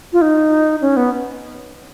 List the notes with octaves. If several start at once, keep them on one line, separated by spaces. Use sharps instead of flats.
F4
D#4
C#4
B3